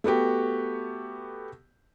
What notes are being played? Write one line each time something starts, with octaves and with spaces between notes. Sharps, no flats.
A3 B3 F#4 G4